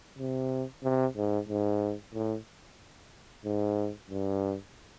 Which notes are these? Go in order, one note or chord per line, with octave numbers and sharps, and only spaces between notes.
C3
C3
G#2
G#2
A2
G#2
G2